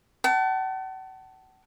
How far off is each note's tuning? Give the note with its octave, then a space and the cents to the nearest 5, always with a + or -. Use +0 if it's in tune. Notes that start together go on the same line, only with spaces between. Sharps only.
F#5 +40 A5 +0